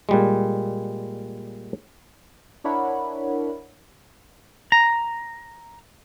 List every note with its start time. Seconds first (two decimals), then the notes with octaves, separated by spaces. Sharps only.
0.09 A#2 G3 G#3
2.64 D4 E4 A#4 C#5 F#5 B5
4.72 A#5